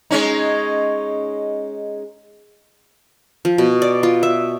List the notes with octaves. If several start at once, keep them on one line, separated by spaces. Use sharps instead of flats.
G#3 C#4 D#4
F3
B2
D5
F4
E5